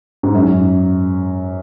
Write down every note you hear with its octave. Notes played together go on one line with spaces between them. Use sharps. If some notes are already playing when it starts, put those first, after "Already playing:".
G#2
F#2